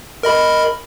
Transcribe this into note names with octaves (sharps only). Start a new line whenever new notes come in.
A#4 D#5 B5